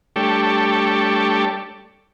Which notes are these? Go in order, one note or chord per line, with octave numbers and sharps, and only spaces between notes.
G3 A3 D4 G4 A4 C#5